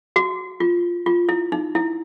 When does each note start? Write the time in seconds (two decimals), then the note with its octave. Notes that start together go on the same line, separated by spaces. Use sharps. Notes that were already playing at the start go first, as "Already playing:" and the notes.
0.16 F#4
0.60 F4
1.06 F4
1.29 E4
1.52 D#4
1.75 E4